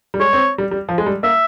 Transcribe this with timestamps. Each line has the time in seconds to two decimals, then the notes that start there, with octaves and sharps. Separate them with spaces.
0.14 G3
0.20 G#3 C#5
0.33 C4
0.58 G3
0.71 G3
0.89 F3
0.98 G#3
1.06 G3
1.23 A#3 E5